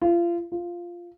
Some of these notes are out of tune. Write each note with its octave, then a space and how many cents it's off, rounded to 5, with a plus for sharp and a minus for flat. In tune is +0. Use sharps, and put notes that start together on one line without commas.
F4 -30
F4 -5